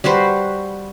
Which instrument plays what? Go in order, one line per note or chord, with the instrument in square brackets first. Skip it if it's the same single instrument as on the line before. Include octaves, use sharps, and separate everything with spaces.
[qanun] G3 F#4 B4 C5